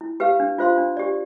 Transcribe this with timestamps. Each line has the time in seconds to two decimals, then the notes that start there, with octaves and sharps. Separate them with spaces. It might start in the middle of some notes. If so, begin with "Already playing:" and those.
0.01 E4
0.20 G4 B4 F5
0.40 D4
0.58 F4 C5 F5 C6
0.78 D4
0.97 G4 D5